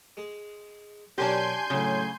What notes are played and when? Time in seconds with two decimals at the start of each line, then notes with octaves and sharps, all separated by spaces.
0.17 G#3 G#4
1.18 B1 C#4 D4 G4 A#4 G#5 C6 G6
1.70 A2 C#3 F#3